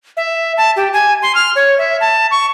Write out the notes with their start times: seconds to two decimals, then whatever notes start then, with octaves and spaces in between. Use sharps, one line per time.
0.17 E5
0.57 A5
0.76 G4
0.93 G#5
1.22 C6
1.35 F6
1.56 C#5
1.78 E5
2.01 A5
2.31 C#6